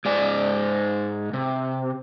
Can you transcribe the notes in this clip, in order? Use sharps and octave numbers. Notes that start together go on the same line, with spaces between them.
G#2 D5 G#5
C3